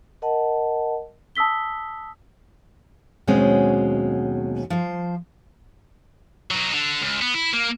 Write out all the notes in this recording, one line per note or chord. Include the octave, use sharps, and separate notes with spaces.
A#4 D#5 F#5 A5
A5 D#6 E6 B6 G7
D#2 B2 F#3 G#3 C4 C#4
F3 C5
F#3 D#4
D3
C#2
B3
E4
A#3